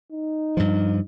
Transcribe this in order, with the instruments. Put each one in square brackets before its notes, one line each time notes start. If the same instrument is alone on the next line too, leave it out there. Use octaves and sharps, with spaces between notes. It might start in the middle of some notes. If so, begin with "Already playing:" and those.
[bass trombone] D#4
[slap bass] G2 F3